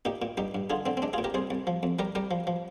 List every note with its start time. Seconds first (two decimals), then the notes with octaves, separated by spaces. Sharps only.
0.05 A#2 D#4 G4
0.22 A#2
0.37 G2 D#4 G4
0.55 G2
0.70 D3 F4 G#4
0.86 D3 C4
0.97 C4
1.02 G#3 D4
1.13 F4 G#4
1.18 A#2
1.24 G4 A#4
1.34 C2 G#4 C5
1.51 C2
1.67 F3
1.83 F2
1.99 G3 G4 A#4
2.15 G3 G4 A#4
2.31 F3
2.47 F3